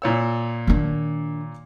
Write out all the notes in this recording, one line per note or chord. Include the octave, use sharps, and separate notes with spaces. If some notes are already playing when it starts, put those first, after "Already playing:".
A#2 C#5 E6
D#3 D4